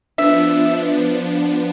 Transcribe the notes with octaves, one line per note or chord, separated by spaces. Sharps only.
F3 B3 D4 E5